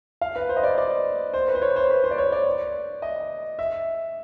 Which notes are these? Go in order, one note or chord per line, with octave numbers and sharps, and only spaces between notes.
F5
B4
C5
D#5
D5
D5
C5
B4
C5
C#5
C5
B4
C5
D5
C#5
D5
D#5
E5